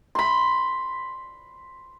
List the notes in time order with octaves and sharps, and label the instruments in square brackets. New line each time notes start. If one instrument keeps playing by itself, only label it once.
[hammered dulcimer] B5 C6